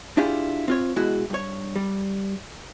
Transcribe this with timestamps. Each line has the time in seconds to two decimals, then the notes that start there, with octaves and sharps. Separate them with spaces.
0.17 D4 E4 F4 G4 G#4
0.68 C4 F4 C#5
0.96 B2 G#3 E4 F#4
1.30 G2 C#5
1.76 G3